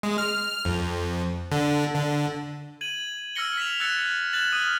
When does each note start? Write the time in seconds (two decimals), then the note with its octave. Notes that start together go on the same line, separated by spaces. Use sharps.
0.03 G#3
0.18 F6
0.65 F2
1.52 D3
1.94 D3
2.81 G#6 D#7 F#7
3.35 E6 F6 G#6 A#6 C#7 G7
3.57 B6 E7 F7
3.80 E6 F#6 G#6 A6 C#7
4.33 F#6 G#6 A6 E7 F#7
4.53 D#6 F6 D#7